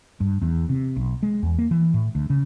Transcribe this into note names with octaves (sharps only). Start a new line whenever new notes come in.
G2
E2
C3
B1
G#3
E2
A#3
E3
A2
D2
C#3